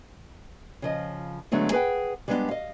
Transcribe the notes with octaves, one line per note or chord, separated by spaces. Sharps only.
C#3 F3 D#5
D3 F#3 G#3 A3 B3
G#4 B4 F#5 G5
G3 G#3 B3 D4 D#4 G4
D#5 F5